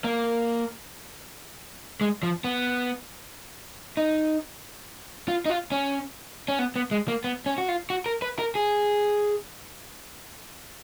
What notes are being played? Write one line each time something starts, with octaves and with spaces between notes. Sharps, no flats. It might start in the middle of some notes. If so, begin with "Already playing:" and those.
A#3
G#3
F3
B3
D#4
F4
D#4
F4
C#4
C#4
B3
B3
G#3
A#3
B3
C#4
F#4
F4
F#4
A#4
B4
A#4
G#4